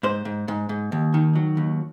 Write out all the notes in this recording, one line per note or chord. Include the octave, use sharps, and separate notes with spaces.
G#2 C5
G#2
G#2
G#2
D#2
D#3
F#3
D#2